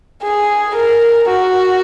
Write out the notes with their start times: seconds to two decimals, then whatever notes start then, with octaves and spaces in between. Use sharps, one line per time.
0.23 G#4
0.75 A#4
1.29 F#4